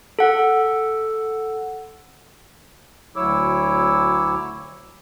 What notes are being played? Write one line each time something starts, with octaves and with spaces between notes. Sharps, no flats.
A4 F#5
D2 F#3 E4 C#5 D6 E6